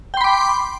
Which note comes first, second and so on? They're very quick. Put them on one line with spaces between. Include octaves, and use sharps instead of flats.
G5 C6 B5 D6